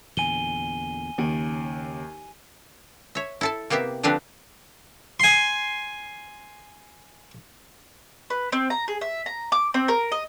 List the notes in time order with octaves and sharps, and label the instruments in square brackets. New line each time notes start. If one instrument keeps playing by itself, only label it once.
[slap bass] E2 A#2 D3 [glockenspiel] G#5 D#7 G7
[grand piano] D#2 [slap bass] C#3
[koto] C#5 E5
E4 A4 A5
C3 A#3 B3 G4 E5
D3 F3 C4 D4 G4 B4
[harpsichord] G#5 C6
[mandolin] B4
C4
A#5
G#4
E5
A#5
D6
C4
A#4
D#5